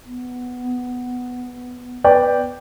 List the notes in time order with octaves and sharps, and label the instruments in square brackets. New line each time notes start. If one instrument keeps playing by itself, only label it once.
[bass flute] B3
[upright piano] B4 D5 G5